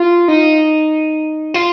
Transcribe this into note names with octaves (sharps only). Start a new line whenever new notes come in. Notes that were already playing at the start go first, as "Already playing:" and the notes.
Already playing: F4
D#4
F4